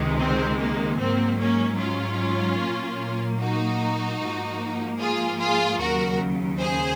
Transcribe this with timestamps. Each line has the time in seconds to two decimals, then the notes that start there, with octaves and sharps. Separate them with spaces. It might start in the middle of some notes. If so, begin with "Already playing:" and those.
Already playing: C#2 C3 D#3 G#3
0.20 C4
0.60 A#3
0.99 G#2 F#3 A#3 C4
1.40 A#3 C#4
1.79 C#4 F4
2.60 A#2 F#3 A#3
3.39 D#4 F#4
4.20 G#2 F3 A#3
5.00 F4 G#4
5.39 F4 G#4
5.80 D#2 C#3 F#3 F#4 A#4
6.60 G#4 C5